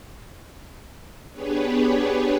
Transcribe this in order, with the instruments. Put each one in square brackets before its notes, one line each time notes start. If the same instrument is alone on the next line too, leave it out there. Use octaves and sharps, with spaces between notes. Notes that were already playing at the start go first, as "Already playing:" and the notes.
[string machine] B3 D4 G4 G#4 B4 C#5